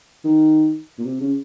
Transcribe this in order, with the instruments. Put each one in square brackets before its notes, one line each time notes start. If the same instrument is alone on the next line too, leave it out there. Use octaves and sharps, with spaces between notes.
[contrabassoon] D#3
A#2
C3
C#3